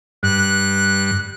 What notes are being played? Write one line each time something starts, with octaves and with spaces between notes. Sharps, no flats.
G2 F#6